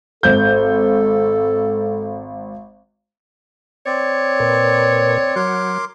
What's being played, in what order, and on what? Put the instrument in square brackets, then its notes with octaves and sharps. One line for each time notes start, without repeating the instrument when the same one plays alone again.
[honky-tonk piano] G#1 G6 [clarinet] A4
[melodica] C4 D5 [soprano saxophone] C#5
[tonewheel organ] A#2 A#4 B4
[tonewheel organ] F#3 F#5 [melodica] A#4 C6 D6